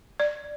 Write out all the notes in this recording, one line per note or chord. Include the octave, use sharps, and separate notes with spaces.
D5